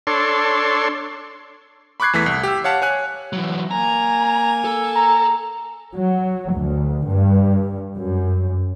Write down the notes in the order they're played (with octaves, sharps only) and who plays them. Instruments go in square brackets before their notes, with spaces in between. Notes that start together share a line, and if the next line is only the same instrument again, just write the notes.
[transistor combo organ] D4 A4 C#5 C6
[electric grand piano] B5 C#6 D6 F#6 G#6 C7
E2 E3 A3 B6
C2
G4 E6
C#5 F5 F#5 A5
C#5 G#5 F#6
[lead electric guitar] E3 F#3
[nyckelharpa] A#3 G#5 [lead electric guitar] A#5
[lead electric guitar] A4
[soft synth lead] A#5
[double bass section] F#3
D2
G2
F#2